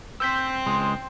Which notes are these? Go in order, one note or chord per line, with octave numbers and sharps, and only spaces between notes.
C4 C5 E6 G6 B6
C#2 G#3 C6